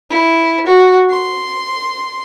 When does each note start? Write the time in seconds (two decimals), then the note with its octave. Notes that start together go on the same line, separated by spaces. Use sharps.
0.10 E4
0.66 F#4
1.10 C6